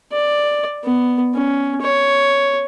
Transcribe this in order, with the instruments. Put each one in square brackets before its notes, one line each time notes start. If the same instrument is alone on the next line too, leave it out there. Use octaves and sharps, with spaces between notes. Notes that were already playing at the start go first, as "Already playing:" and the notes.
[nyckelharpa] D5
B3
C#4
C#5